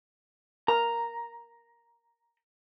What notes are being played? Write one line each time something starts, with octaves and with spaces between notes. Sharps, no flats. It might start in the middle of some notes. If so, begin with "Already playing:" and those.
A#4 A#5